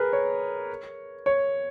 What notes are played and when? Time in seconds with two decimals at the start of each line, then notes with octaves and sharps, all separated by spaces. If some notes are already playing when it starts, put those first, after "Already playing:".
Already playing: G#4 A#4 B4
0.13 C#5
1.26 C#5